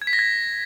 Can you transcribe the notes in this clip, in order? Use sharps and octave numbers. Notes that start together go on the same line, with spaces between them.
G#6
B6
A#6
G#6